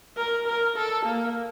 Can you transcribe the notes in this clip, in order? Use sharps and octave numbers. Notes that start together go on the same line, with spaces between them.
A#4
A#4
A4
A#3